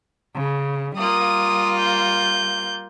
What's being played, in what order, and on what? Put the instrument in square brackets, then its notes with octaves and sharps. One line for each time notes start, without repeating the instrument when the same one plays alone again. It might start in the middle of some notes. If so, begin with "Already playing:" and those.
[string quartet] C#3
[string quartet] G3 A#3 F4 [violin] D#6
[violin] G6